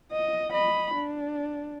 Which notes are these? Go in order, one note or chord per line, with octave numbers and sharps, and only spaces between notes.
D#5
D#5 B5
D4